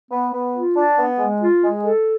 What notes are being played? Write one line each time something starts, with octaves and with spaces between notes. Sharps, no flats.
B3
B3
F4
D4
B3
G#3
F4
G#3
A4